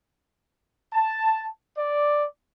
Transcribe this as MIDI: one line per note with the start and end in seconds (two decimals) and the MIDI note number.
0.93 1.46 81
1.78 2.26 74